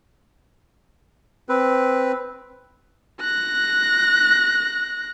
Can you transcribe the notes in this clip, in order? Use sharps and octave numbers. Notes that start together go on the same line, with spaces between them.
C4 B4
F#6 A#6